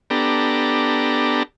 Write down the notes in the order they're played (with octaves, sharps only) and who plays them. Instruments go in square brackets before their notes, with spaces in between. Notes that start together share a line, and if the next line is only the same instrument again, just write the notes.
[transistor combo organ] B3 D4 G4 A4 A#5